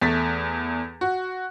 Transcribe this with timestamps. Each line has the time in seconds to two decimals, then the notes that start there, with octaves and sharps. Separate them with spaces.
0.02 E2 A3 A6 B6
1.01 F#4